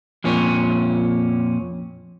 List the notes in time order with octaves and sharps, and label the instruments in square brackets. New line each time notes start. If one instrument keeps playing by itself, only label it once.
[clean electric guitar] F2 A#2 C#4